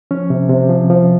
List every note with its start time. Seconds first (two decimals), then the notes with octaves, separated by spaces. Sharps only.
0.11 F3 C#4
0.30 C3
0.50 C3
0.69 F3
0.90 F3